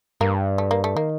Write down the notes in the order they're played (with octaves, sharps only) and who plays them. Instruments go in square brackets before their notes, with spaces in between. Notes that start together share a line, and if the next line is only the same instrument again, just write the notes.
[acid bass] G2 [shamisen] A#3
[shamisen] A3
A#3
A3
[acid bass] D#3 [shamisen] A#3